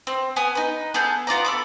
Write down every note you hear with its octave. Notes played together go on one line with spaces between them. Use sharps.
C4
B3 G#5 D#6
D#4 B4
B3 G#4 A4 G6
B3 F4 D5 A#5
A4 B5 D6